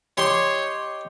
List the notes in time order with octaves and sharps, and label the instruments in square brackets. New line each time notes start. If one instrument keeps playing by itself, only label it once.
[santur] G4 D#5 [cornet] C#5 [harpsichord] C6